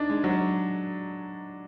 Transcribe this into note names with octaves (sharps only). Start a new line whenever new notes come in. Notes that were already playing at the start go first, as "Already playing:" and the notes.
Already playing: D4 D#4
G#3
F#3